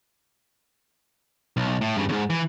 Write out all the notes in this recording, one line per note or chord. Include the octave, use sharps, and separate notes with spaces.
B1
A2
G2 C#3
D#2 G#2
E3